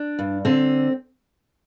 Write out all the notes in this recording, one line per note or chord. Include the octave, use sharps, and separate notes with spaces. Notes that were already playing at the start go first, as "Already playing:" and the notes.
Already playing: D4
G2
D3 C4